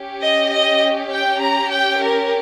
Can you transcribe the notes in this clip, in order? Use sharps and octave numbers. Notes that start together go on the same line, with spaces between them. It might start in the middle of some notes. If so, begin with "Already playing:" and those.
Already playing: C#4 G4
D#5
D#5
G5
A#5
G5
A#4